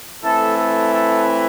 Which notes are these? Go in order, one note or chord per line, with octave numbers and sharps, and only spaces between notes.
E3 A3 C4 E4 A4
A4
A4